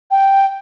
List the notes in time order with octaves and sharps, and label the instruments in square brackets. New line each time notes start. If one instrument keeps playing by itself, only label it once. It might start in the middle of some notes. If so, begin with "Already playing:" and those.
[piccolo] G5